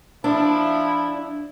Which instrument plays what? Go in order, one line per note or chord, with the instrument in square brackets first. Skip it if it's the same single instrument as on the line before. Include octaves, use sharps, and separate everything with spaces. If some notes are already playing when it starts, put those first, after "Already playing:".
[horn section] F3 E4 [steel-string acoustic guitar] D4